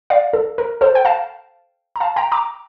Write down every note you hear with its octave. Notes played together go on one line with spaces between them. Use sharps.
D5 F5
A4
A#4
A4 C5
G5
F5 A5
A#5
F5 A5
G5 A#5
A#5 D6